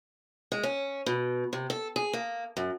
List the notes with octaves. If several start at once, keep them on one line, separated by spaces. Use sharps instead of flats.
G#3
C#4
B2
C3
A4
G#4
A#3
F#2